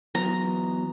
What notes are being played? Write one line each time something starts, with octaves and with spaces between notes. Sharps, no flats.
E2 F#3 B3 A#5